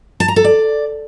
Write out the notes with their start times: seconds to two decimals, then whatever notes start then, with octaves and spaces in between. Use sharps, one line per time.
0.20 A5
0.28 A#5
0.36 A4
0.44 D5